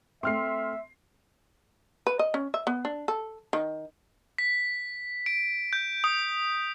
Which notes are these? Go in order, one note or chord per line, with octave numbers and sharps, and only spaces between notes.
A3 C4 E5 C6 F6 C7
B4
D#5
C#4
E5
B3
D4
A4
D#3
B6
D7
G6
D#6